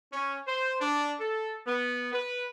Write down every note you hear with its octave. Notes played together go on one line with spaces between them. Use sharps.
C#4
C5
D4
A4
B3
B4